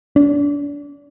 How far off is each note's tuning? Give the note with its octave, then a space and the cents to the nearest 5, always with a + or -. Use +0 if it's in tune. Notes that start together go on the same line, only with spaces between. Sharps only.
D4 -35